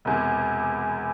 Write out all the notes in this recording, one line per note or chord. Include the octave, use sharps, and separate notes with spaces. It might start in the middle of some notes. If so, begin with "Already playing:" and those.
E1 E2 C3